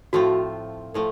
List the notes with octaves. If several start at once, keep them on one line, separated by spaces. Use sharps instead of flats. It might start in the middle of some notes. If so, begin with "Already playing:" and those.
A2 F3 A3 C4 F4 F#4
A2 F3 A3